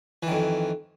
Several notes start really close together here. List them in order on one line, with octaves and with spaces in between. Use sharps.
E3 D#3 F2